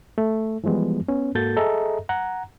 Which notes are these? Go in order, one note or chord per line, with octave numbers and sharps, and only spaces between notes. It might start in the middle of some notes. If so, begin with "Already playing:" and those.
A3
E3 F3 G3 G#3 B3
B3 C#4
G#2 A#3 F#4 A4 G6 A6
G#4 A4 D#5 E5 A#5
F#5 A#5